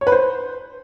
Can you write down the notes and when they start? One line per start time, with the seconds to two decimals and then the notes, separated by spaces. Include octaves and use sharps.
0.01 C#5
0.07 B4
0.12 C5